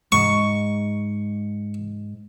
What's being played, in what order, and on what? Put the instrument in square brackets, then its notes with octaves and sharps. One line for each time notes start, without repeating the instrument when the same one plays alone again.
[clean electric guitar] G#2 [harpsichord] C#6